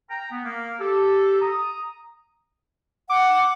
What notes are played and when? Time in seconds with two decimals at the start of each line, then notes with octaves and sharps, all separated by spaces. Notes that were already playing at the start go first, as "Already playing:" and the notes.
0.10 G5 A#5
0.32 B3
0.45 A#3
0.80 G4 A4
1.42 A#5 D#6
3.10 F#5 D6